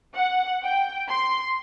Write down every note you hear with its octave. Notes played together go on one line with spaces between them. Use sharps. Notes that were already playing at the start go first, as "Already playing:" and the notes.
F#5
G5
C6